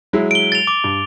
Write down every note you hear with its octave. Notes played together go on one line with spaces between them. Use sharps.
F#3 G#3 E4
D7 G7
A6 F7
D6
G2